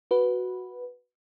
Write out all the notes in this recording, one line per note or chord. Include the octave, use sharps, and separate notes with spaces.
F#4 B4